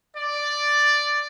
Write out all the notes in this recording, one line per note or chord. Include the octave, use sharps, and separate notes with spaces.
D5